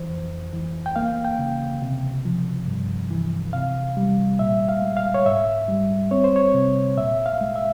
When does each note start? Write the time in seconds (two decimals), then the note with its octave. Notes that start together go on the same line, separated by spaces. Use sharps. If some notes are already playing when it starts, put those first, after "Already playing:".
Already playing: E3 C5
0.09 F2
0.53 E3
0.86 G5
0.96 A#3 F5
1.25 G5
1.39 C#3
1.82 C3
2.25 F3
2.67 G2
3.11 E3
3.53 C3 F5
3.97 G3
4.39 A#2 E5
4.69 F5
4.82 G#3
4.97 F5
5.14 C#5
5.26 G#2 E5
5.68 G3
6.11 C4 C#5
6.24 C5
6.36 C#5
6.54 C3
6.97 A#2 E5
7.26 F5
7.41 G#3
7.56 E5